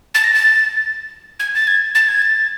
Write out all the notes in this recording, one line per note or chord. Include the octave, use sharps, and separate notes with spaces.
A6
A#6
A6
G#6
A6
G#6
A6
G#6
A6